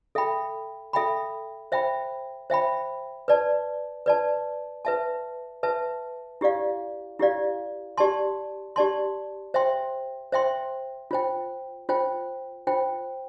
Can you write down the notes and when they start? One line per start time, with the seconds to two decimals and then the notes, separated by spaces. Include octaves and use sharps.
0.15 A4 E5 G5 B5
0.93 A4 E5 G5 B5
1.72 C5 E5 G5 B5
2.50 C5 E5 G5 B5
3.28 B4 D5 A5
4.06 B4 D5 A5
4.85 B4 E5 A5
5.63 B4 E5 A5
6.41 E4 G4 D5 F5
7.19 E4 G4 D5 F5
7.97 G4 D5 A5 C6
8.76 G4 D5 A5 C6
9.54 C5 E5 G5 C6
10.32 C5 E5 G5 C6
11.11 F4 C5 G5
11.89 F4 C5 G5
12.67 F4 C5 G5